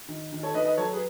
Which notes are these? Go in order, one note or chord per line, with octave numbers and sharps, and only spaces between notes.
D#3
D#3
A4 C#5
D#3 B4 D#5
B4 D#5
F#3 A4 C#5
G#4 B4